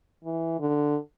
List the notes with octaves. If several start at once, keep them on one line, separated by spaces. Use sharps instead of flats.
E3
D3